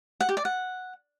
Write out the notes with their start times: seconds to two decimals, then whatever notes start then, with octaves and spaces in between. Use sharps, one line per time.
0.21 F#5
0.29 G4
0.37 D5
0.45 F#5